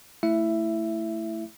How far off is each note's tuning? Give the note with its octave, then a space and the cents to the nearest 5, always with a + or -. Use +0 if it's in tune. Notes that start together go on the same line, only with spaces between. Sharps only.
A3 +10 E4 +0 E5 +15